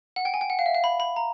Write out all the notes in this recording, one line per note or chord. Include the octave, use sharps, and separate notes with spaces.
F#5
G5
G#5
G5
F#5
F5
E5
F5
B5
B5
A#5